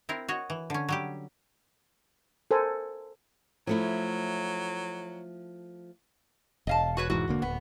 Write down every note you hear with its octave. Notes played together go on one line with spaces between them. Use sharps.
C4 E4 A#4
F#4 C#5 D#5
E3
D3 C#4
F#3 G3 G4
A4 A#4 C5 G#5
F3 F#3 A3 E4
E1 D#5 F5 A5
F#4 B4 C#5
E1 G#2 E3 F#4
E1 D3 A#3
D1 B3